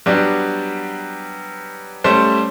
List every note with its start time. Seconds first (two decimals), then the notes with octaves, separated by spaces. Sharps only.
0.06 F#3 G3 B3 D4
2.04 G3 A3 C#4 C5